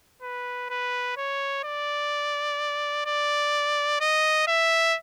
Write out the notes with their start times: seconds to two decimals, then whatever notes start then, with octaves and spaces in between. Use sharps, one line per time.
0.22 B4
0.70 B4
1.17 C#5
1.64 D5
3.06 D5
4.01 D#5
4.47 E5